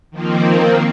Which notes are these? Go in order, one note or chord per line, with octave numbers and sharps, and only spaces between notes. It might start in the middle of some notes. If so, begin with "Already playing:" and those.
D#3 F3 A#3 C4